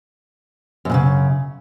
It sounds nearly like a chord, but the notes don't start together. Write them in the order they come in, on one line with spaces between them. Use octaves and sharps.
F#2 A#2 C#3